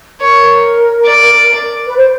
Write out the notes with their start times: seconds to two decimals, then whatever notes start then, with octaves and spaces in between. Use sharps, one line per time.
0.21 A#4 C#5
1.05 D5
1.87 B4
1.96 C5